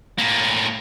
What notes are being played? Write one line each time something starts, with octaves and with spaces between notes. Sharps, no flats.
A2 A#3